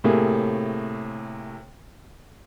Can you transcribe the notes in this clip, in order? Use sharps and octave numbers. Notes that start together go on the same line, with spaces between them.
A2 C3 A3 A#3 G#4